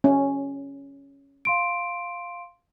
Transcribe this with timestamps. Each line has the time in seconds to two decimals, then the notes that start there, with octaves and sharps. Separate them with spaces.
0.04 C#4
1.45 F5 C6 D7